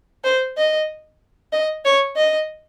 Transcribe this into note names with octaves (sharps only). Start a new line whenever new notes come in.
C5
D#5
D#5
C#5
D#5